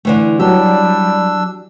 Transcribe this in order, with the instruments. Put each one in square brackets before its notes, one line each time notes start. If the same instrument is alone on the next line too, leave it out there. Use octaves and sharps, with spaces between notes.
[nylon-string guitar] D3 E3 A3
[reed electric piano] F#3 [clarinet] G3 [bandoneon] D4 E6 [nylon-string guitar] G4